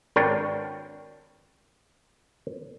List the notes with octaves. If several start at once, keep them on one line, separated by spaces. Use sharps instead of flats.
G#1 D4 A#4 B4 C#5 G5